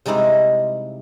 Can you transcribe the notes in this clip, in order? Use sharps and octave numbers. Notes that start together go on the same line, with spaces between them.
C3 G3 G#3 D#4 E4 C5